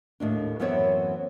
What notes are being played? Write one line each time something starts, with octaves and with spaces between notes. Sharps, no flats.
D#2 A2 D4
F#2 E3 B3 C4 C#5 E5